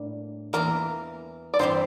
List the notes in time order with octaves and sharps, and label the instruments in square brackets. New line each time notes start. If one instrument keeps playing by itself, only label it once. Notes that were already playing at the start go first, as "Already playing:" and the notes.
Already playing: [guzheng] A2 G3 A#3 D4
[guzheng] E2 E3 A#3 E4 [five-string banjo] A#4
[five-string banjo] D5
[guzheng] G2 E3 G3 C4 E4 [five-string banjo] C5